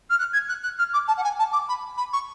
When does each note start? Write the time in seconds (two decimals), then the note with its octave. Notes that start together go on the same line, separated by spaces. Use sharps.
0.10 F6
0.19 F#6
0.33 G#6
0.48 F#6
0.63 F#6
0.78 F6
0.93 D6
1.08 A5
1.17 F#5
1.24 G#5
1.39 A5
1.52 D6
1.68 B5
1.97 B5
2.13 C#6